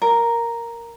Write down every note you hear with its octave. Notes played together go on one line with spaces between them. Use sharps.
A#4